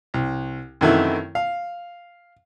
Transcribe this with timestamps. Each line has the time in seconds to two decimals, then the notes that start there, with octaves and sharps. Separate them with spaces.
0.14 C2
0.81 F#2 C3 D#3 E3 A3 E4
1.35 F5